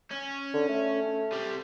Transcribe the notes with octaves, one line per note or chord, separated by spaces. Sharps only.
C#4
D3
A3
C3 G3